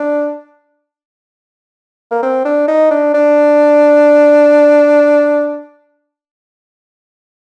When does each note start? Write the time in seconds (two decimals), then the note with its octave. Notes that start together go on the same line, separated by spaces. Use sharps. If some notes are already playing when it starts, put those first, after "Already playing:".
Already playing: D4
2.11 A#3
2.23 C4
2.45 D4
2.68 D#4
2.91 D4
3.14 D4